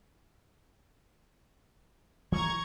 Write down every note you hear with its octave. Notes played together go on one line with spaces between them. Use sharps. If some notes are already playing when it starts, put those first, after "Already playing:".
E3 F#3 A3 A#5 C#6 G#6